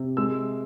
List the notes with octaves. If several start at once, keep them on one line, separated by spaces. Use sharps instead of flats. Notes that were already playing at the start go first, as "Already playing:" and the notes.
Already playing: C3
G#3 E6